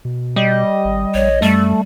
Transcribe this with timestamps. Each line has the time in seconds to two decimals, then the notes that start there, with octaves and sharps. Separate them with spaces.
0.05 B2
0.36 G3 D#5
0.85 G#1
1.15 A#1 C#5
1.42 F#2 G3 A3